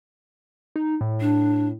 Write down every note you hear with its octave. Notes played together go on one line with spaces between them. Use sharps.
D#4
A2
D4